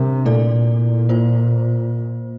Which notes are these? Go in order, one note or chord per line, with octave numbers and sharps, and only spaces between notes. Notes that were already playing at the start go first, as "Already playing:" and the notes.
Already playing: C3 G3 D4 A#4
A#2 A3 E4 A4 D5
A#3 F4 C5